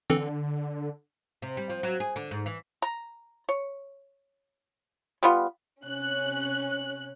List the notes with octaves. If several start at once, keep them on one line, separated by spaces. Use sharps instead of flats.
D3 E3 C4 A4
C3
G3
F3
F#3
G#4
D3
G#2
E3
A#5
C#5
G3 B3 F4
C3 C#4 F#6